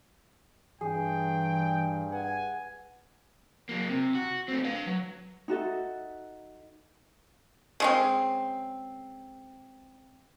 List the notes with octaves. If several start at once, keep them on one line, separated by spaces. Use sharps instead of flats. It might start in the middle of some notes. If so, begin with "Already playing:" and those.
G2 E3 G#4 G5
B4 F#5 G#5
F#3 A#3
C3
F#4
A3 C4
B4 F5
F#3
D#4 F#4 A4 E5
C#3 G#3 C4